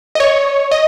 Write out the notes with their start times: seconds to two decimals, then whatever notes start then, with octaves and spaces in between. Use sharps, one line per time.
0.15 D#5
0.20 C#5
0.71 D#5